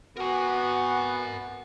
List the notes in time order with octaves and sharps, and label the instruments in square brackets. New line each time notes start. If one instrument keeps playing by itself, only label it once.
[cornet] B3 [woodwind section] F#4 [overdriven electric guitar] A#4 G#5 [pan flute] F#5